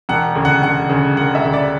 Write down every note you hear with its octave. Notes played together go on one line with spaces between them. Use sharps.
E1 F#5
D2 C#3
F#5
E1 F#5
D2 C#3
E1 F#5
E5
D2 C#3
D5